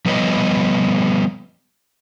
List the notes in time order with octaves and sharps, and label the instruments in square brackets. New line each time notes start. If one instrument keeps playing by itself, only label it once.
[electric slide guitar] F3 G3 B3 B4 C#5 D#5